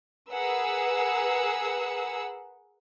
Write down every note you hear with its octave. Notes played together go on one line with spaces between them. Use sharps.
G#4 A#4 B4 F#5 E6